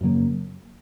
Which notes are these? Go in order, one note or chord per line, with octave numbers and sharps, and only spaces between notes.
F#2 C#3 F#3 A#3